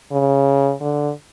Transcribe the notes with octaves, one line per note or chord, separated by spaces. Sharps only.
C#3
D3